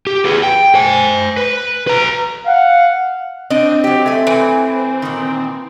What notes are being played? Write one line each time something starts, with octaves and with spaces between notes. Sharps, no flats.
G4
G#4 B4
G5
C5 G#5
B4
B4 A#5
F5 F#5
C4 D4 D#5
F#3 G4
A3 G#5
E3
A#2 D#3